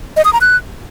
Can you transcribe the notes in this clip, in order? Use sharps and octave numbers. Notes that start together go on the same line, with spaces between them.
D#5
D#6
A#5
F#6